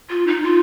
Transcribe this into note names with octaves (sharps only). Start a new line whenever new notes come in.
F4
D#4
F4